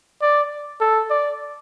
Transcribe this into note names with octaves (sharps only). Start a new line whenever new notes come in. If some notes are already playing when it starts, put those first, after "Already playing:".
D5
A4
D5